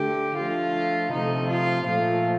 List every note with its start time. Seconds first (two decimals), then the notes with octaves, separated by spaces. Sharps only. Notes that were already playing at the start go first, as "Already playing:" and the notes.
Already playing: D3 A3 G4
0.37 D3 F3 A3 F4
1.12 C3 F3 A3 D#4
1.49 F4
1.86 A#2 F3 A3 F4